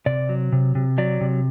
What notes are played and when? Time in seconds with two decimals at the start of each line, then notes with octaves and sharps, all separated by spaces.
0.06 C3 D5
0.29 F#3
0.52 C3
0.75 C3
0.98 F#3 D5
1.21 C3